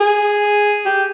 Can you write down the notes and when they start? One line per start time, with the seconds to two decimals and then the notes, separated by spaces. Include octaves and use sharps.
0.01 G#4
0.86 G4